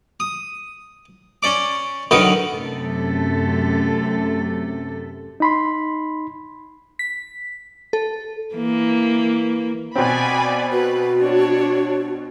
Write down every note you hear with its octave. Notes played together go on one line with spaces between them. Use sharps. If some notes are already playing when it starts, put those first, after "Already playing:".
D#6
C#4 D5 D6
D3 D#3 F#3 A#4 B4 D#6
F#2 C3 A3 A4
D#4 B5 C6
B6
A4
E3 A#3
B2 C4 D5 G#5 B5
F#4 B4
D4 C#5